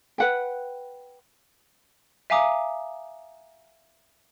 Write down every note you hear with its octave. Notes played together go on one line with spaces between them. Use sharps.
B4 F#5 G5
E5 F5 G#5 A#5 D6 D#6